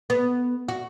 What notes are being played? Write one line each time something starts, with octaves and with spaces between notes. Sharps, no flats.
B3
F#4